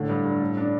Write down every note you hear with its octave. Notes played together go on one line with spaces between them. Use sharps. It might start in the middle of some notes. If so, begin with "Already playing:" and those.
Already playing: A2 D3
G2
G2
A2
D4